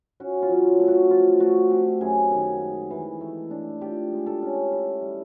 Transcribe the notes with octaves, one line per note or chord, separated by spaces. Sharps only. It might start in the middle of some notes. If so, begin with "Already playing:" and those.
C#4 F#4
F4
F#3
A3
F#4
F3 F4
A3 F#4
C4 G4
F#2 G#4
D#3
G#3
E3
A3
D4
F4 G4
G#3
A4
C#4
E4
G3